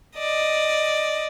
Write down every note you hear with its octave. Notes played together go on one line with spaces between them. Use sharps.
D5 D#5